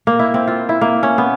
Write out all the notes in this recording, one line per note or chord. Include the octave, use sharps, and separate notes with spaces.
A#3
E4
C4
F4
E4
A#3
C#4
B3